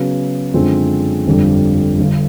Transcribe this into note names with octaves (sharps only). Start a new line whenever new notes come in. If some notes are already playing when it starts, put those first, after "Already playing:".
Already playing: C#3 F#3 B3
F#2 D3 F3 G#3 C4
G1 F2 D3 G3
G1 G2 D3